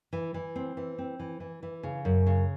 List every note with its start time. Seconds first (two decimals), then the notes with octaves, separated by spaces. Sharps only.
0.13 E3
0.34 E3
0.56 C4
0.77 E3
0.98 C4
1.19 E3
1.40 E3
1.63 E3
1.83 C#3
2.05 F#2
2.27 C#3